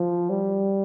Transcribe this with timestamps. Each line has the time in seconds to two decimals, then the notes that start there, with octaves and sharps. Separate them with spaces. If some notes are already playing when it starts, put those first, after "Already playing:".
Already playing: F3
0.29 G3